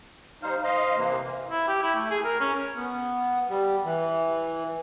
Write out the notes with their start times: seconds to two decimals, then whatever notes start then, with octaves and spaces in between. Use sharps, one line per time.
0.43 G3 D#4 C5 F5
0.64 C5 D#5 F5
0.97 C3 E3 A#3
1.51 E4
1.68 G4
1.83 E4
1.95 A3
2.10 G#4
2.24 A#4
2.40 C#4
2.76 B3
3.49 G3
3.85 E3